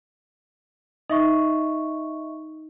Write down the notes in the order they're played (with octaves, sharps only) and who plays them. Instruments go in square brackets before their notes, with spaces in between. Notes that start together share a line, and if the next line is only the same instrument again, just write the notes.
[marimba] D#4 [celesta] D#5 E5 C#6